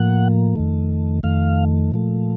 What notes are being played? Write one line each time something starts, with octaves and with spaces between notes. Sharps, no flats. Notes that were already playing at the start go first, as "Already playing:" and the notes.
Already playing: A2 F3 A#3 F#5
F2 D#3 A3
F2 D#3 A3 F5
A#2 F3 A3